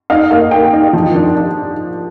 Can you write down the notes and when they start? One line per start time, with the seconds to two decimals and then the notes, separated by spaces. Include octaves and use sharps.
0.10 D#4 F5
0.31 A#3 F5
0.51 A#3 G5
0.73 D#4
0.93 F3
1.15 D4
1.35 D4